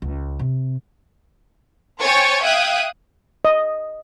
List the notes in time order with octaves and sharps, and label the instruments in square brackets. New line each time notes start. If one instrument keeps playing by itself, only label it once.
[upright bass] C#2
C3
[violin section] C5 C#5 G5 G#5 C#6 A6
E5 F5 G5 D#6 F#6 G#6
[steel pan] D#5